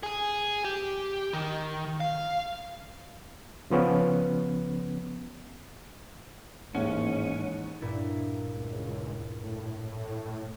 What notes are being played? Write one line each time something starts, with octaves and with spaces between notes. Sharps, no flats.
G#4 G#5
G4
D#3
F5
C#3 F3 B3 C#4
A1 D#2 G#2 C#4 F#5
G2 A#2 E4
C#2
A2